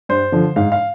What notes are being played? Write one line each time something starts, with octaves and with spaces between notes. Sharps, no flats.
G2 C5
D3 F3
G#2 F5
F5